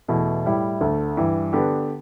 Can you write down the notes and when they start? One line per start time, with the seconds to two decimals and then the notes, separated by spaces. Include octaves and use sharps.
0.08 E2 B2 A3 E4
0.45 A2 G3 E4
0.81 D2 D3 A3
1.17 G2 E3 G3
1.53 D3 B3 D4 G4